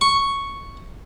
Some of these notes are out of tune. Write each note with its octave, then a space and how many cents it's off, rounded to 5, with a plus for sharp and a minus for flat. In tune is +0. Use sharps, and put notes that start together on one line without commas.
C#6 +0